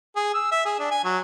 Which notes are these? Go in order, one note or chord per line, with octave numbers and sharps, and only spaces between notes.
G#4
E6
E5
G#4
D4
G#5
F#3